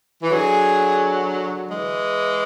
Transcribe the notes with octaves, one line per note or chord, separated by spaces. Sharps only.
E3
D3 F#3 G#4
E3 G#3